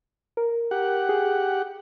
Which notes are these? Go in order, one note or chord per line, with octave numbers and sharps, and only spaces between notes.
A#4
G4 F#5
G#4